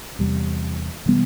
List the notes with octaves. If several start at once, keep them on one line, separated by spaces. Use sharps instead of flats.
E2 C3 G3
C3 E3 G3 B3